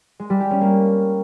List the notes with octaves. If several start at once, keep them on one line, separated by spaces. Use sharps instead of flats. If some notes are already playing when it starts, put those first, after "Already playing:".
G#3
G3
G4
C#4
A#3